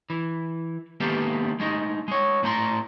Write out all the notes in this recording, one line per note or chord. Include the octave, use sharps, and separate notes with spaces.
E3
D#3 G#3 A#3 B3 G4 A4
G#3 A3 D#4
G#3 C#5
A2 A3 A#5 C6